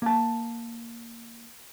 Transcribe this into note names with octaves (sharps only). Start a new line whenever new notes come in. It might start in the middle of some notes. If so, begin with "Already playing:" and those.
A#3 A5